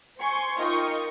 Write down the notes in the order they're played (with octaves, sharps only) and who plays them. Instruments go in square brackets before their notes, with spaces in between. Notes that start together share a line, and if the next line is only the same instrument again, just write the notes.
[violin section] C5 G#5 C6 C#6
D#4 F4 A#4 D#5 G5 C#6